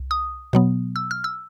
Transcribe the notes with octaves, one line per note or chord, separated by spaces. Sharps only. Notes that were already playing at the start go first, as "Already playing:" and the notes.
Already playing: C2
D#6
B2 F#3 B3
E6
F6
E6